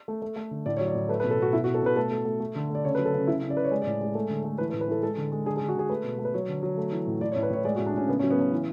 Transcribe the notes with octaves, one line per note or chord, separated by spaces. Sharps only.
A3
A3
A3
D3
A2 D5
C#5
F#3
D5
A2
A3 B4
B4
B2
A4
B2 F#4
B2 E4
F#4
B2
A4
B2 B4
A3 A4
A3
A3
A3
D3
A3
D5
C#3 C#5
B4
F#3
A4
C#3
C#3 E4
C#3
D5
C#3 B4
C#5
G#3 D5
D5
A2
G#3 G#4
A3 A4
D3
A3
E3 B4
B4
A2
B4
E3 A4
G#3 A4
D3
G#3
D3 G#4
G#4
D3
F#4
D3 G#4
A3 B4
B2
A3
B4
F#3 C#5
D3
F#3
A3
E3
A2
A2 D5
C#5
A2
B4
A2 C#5
G#3 D5
F#4
A2
D4
A2 C#4
C#3 B3
C#4
F#3
B3
C#3 C#4
E3